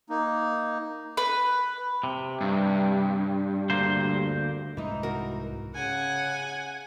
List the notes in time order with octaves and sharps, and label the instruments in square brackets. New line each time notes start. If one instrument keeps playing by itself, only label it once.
[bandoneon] A#3 D#4
[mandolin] B4
[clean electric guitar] C3
[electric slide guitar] G2
[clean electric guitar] D2 A#3 C5
[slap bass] C2 G#2 G#3 [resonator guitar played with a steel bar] E3 D#4
[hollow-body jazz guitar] F#4 A#4
[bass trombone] C#3 [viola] F#5 [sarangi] G#5